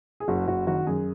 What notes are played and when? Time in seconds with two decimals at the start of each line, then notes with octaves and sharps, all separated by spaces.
0.20 G#4
0.28 F#1 F#4
0.47 F#1 F#4
0.67 D#3 F#4
0.87 F#2 G#4